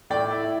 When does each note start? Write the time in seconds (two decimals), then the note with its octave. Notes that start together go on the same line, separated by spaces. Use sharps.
0.10 A2 D5 G5
0.31 E4